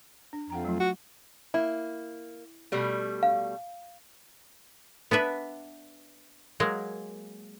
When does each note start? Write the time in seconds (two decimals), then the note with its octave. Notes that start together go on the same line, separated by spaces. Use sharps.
0.33 D4
0.50 F2 F#5 G5 A#5
0.65 F#3 A3 F4
0.80 F#4
1.54 A#3 E4
2.72 B2 G3 A3
3.23 F5
5.11 B3 D4 B4 E5
6.60 F#3 G#3 A#3